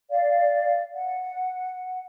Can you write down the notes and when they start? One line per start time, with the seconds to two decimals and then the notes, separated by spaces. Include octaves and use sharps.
0.09 D5 F5
0.94 F#5